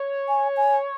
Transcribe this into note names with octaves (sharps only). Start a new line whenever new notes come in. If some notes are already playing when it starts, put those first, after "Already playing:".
Already playing: C#5
G#5
G#5